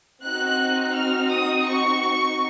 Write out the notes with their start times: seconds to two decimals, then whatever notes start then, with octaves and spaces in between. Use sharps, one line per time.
0.23 C4 D#4 F#4 F#6
0.95 F6
1.31 D#6
1.66 C#6